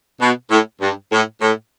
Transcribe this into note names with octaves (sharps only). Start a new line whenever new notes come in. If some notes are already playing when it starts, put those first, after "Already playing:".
B2
A2
G2
A2
A2